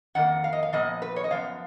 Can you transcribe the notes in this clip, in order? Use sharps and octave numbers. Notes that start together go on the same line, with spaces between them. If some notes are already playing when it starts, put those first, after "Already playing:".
F2 D#3 A#3 F#5
F5
D#5
F5
A#2 F3 B3 D#5
B4
C#5
D#5
F#2 F3 B3 F5